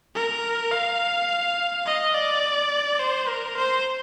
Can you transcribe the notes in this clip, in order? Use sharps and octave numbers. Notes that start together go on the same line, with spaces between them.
A#4
F5
D#5
D5
C5
A#4
C5